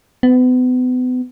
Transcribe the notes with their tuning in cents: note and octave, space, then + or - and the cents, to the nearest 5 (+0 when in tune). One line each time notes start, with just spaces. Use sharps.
B3 +35